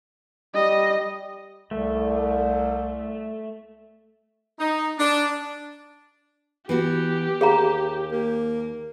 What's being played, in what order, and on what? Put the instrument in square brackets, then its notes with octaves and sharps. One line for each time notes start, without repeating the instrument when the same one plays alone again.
[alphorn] G3 [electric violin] D#5
[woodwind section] C2 [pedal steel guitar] A3
[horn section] D#4
D4
[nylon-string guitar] E3 B3 F#4 [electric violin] G4
[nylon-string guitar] D#2 [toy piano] G#4 F5 A#5
[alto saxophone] A#3